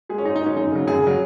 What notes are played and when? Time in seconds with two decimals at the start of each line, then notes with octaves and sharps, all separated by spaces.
0.09 G#3 G#4
0.18 C#4
0.25 G#2 D#4
0.36 D#4
0.41 G#3 C#4
0.56 F#2 D#4
0.72 C#3 F#3
0.87 F#2 G#4
1.03 C#3 F#3